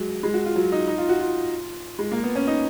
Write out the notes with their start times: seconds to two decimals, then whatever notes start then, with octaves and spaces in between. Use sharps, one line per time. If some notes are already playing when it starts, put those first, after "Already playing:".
Already playing: F#3 G#3
0.23 G#3
0.34 F#4
0.45 F4
0.56 F#3
0.72 D#4
0.87 D#4
0.98 F4
1.09 F#4
1.20 F4
1.99 G#3
2.12 A#3
2.23 B3
2.35 C#4
2.47 D#4